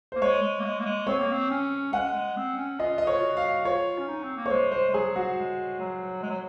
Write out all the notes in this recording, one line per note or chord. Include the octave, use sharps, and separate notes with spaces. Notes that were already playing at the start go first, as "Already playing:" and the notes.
A#3 C5
G#3 C#5
G#3
A#3
G#3
A#3
G#3
C4 C#5
A#3
C4
C#4
G#3 F#5
G#3
C4
C#4
F4 D#5
D#5
C#5
F#4
F5
F4 C#5
C#4
D#4
C4
A#3
C#5
G#3 C5
C5
G#3
F#3 G#4
F#4
G#3
F#3
G#3
F#3